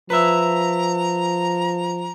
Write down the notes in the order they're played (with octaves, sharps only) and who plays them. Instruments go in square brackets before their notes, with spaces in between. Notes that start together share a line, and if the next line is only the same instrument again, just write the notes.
[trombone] F3 [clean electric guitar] B4 E5 [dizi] A#5